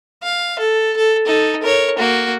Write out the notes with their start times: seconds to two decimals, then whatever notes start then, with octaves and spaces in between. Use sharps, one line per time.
0.23 F5
0.59 A4
0.97 A4
1.26 D#4 A4
1.62 A#4 C#5
1.98 A#3 F#4